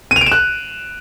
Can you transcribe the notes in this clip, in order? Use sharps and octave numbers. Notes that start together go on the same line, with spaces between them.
D#7
F7
D7
E7
F#6